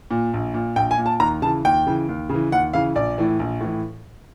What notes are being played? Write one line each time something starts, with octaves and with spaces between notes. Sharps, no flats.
A#2
A#1
A#2
A#1 G5
G#5
A#2
A5
D#2 A#5
C#3 E3 A5
D#2 G5
C#3 E3
D#2
C#3 E3
D#2 F#5
C#3 E3 F5
A#1 D5
A2 E3
A#1
A2 E3